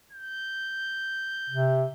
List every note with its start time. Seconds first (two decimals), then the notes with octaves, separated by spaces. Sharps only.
0.12 G6
1.50 C3